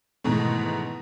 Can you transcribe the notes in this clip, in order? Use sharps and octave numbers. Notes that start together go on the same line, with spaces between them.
G#2 B2 D#3 E3 A3